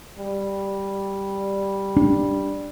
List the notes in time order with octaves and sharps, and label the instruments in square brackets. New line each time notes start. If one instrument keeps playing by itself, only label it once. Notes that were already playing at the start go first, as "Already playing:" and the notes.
[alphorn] G3
[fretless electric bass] D4